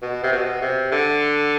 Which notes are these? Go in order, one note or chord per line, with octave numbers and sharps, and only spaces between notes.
B2
C3
B2
C3
D3